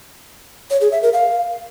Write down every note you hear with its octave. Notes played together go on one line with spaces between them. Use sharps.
C#5
G#4
E5
A#4
F5